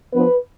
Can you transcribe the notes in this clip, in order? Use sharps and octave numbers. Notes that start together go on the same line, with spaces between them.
F3 B3 D4 B4